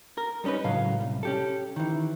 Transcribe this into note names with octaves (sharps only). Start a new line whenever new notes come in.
A#4
G3 B3 C#4 D#4 B4
C#2 A2 F#3 F5
C2
C#4 G4 A4
D#3 E3